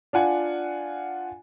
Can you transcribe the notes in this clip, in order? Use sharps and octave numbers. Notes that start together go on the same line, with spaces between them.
D4 F4 F#5 G#5